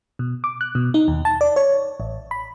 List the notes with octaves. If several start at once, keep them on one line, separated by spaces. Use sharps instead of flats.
B2
D6
F#6
B2
D#4
D#2
A5
D5
C#5
A1
B5